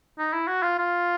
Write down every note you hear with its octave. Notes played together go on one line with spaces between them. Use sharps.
D#4
E4
F#4
F4
F4